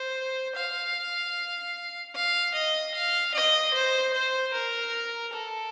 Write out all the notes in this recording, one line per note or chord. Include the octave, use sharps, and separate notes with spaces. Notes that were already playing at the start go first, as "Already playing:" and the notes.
Already playing: C5
F5
F5
D#5
F5
D#5
C5
C5
A#4
A4